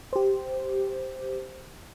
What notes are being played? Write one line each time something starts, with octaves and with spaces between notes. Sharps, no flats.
G4 C5